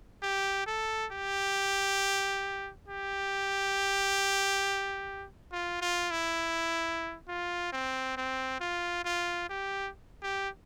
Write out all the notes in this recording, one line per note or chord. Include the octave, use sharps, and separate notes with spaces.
G4
A4
G4
G4
F4
F4
E4
F4
C4
C4
F4
F4
G4
G4